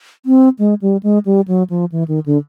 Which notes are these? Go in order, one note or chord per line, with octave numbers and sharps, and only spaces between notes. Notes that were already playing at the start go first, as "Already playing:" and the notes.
C4
G#3
G3
G#3
G3
F#3
F3
E3
D#3
D3